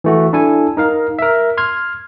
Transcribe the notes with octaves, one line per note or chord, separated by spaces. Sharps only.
E3 A3 F#4
D4 E4 A4 G#5
D#4 A#4 F5 A#5
A#4 E5
C6 F6 G#6